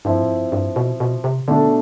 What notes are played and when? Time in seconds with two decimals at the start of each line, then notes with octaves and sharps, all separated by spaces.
0.05 G2 F3 C4 E4
0.22 A2
0.29 G2
0.52 G2
0.76 B2
1.00 B2
1.24 C3
1.48 B2 D3 A3 D4 A4